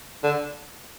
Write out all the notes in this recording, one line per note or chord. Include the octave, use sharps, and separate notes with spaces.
D3